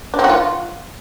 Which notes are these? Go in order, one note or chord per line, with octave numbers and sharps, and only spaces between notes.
D4
C4
F#4
F4